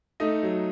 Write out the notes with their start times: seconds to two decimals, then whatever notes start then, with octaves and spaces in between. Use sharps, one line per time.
0.20 A3 D#4 D#5
0.43 F#3